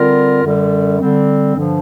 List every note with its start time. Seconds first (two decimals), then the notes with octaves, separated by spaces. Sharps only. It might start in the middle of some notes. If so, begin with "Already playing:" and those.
Already playing: D3 G3 C4 F4 A#4
0.43 F#2 D3 G3
0.99 D3 G3 C4
1.55 G2 D3 F3